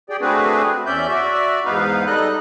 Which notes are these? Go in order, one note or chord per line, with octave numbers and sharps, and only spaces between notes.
G4 G#4 D5 G5
A3 C4 D4 F#4 G#4 B4
E2 C#4 D5 E5 G6
F#4 D5 E5
E2 G#2 B3 D#4 B4 F5
G3 D#4 A4 D#5 F#6